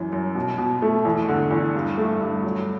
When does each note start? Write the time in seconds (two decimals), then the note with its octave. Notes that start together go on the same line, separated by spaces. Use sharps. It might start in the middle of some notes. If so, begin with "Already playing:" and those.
Already playing: F#2 E3
0.13 F#2
0.35 B2
0.58 B2
0.82 A3
1.05 E2
1.29 D3
1.51 E2
1.75 G2
1.98 A3
2.21 G2
2.44 F#3